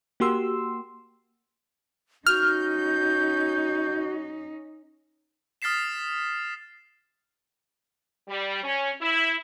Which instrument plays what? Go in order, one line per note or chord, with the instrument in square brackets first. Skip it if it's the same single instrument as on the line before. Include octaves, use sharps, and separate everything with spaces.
[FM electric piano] A#3 F#4 G4 C6 E6
[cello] C#4 D#4 [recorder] F#4 [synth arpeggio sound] F6 [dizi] G6
[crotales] D#6 F6 A6 B6 C7 E7
[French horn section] G3
C#4
E4